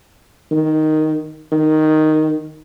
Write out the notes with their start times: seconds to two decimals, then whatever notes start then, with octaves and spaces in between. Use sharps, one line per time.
0.52 D#3
1.52 D#3